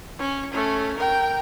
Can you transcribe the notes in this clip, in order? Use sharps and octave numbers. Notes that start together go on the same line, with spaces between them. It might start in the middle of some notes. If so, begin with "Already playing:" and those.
C#4
A3 C#4
A#4 G5